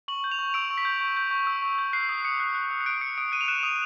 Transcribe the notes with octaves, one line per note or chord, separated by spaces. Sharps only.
C#6 F#7
G6
F7
C#6
E6 D7
C#6
B6
G6
C#6
G6
C#6
E6
C#6
G6
F#6 C7
D#6 C7
D#6 C#7
F#6
F#6
D#6
C#7
F#6 D7
D#6 C#7
D#6 D7
F#6 D#7
F7
F#6 E7
D#6 F7